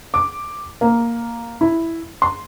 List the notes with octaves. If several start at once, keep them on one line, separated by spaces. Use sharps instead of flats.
D6
A#3
E4
C6